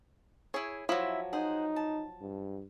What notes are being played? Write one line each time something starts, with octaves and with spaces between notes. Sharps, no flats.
E4 G#4 C#5
F3 F#3 E4 E5
D#4 G#4 C5 F#5
A5
G2